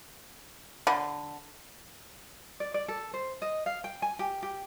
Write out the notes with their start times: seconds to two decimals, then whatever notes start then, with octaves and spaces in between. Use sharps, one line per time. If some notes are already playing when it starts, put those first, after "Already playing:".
0.87 D3 F#5 B5
2.60 D5
2.74 D5
2.88 A4
3.14 C5
3.42 D#5
3.66 F5
3.84 G5
4.02 G#5
4.19 G4
4.43 G4